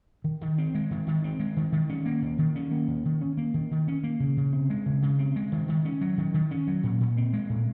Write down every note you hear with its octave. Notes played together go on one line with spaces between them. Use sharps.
D#3
D#3
C4
G#3
D#3
D#3
C4
G#3
D#3
D#3
C#4
A#3
D#3
D#3
C#4
A#3
D#3
D#3
C#4
A#3
D#3
D#3
C#4
A#3
C#3
C#3
C4
G#3
C#3
C#3
C4
G#3
D#3
D#3
C#4
F#3
D#3
D#3
C#4
F#3
A#2
A#2
C4
G#3
A#2